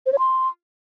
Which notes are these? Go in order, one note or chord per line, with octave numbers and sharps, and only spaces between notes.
C5
C#5
C6